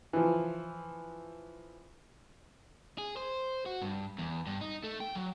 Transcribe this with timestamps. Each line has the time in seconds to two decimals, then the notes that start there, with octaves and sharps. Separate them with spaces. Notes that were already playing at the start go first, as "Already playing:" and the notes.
0.13 E3 F3
2.98 G#4
3.17 C5
3.66 F#4
3.82 G2
4.18 E2
4.47 G2
4.61 D#4
4.84 A3
5.00 G5
5.15 F#3